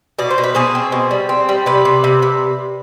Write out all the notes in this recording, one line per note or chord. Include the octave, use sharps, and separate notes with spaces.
B2 D5
C5
B2
B4
B2 G#4 C5
C4
B2
G3
C4
G3
C3 B4 D5
C3
C3
C3